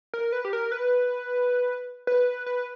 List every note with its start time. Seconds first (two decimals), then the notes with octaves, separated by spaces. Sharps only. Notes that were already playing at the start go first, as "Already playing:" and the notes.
0.14 A#4
0.32 B4
0.45 G4
0.53 A#4
0.72 B4
2.07 B4
2.46 B4